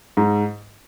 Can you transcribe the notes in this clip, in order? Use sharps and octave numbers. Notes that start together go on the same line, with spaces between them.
G#2